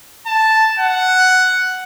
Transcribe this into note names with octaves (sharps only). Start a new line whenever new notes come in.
A5
F#5